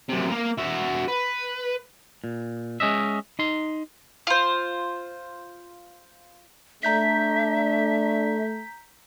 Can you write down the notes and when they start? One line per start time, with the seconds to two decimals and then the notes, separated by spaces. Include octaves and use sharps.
0.09 F#2 C3
0.32 A#3 F5
0.59 F#4 E5
1.08 B4
2.24 A#2
2.80 G#3 C#4 D#5 E5
3.39 D#4 C6
4.27 F4 C5
6.83 A3 D4 E5 A#5 G6 B6